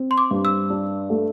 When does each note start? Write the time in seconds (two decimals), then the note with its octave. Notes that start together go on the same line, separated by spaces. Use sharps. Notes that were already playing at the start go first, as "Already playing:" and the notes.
Already playing: C4
0.11 C6
0.18 D6
0.31 G2
0.45 E6
0.70 D4
1.10 A3